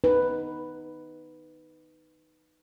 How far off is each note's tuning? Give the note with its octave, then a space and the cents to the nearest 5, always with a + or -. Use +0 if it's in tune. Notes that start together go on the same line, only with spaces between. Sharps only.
D#4 +0 B4 +5